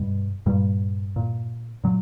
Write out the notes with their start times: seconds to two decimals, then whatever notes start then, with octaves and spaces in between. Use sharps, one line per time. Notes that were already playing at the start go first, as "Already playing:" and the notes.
Already playing: G2 B2 G3
0.46 G2 A#2 G3
1.16 A#2
1.84 A#2 F#3